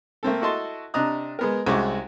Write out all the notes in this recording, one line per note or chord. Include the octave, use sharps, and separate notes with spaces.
A3 A#3 C4 A4
E4 F#4 A4 D#5 A5 C6
C3 D4 D#5 A#5 D#6 F#6
G#3 B3 A#4
C2 G#3 C#4 E4 F#4 D6